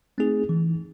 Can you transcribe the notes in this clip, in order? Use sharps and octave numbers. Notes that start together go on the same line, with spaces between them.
A3 C4 D#4 G#4
E3